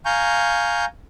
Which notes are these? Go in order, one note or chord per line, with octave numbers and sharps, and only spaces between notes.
F5 G#5 A#5 C#6 G6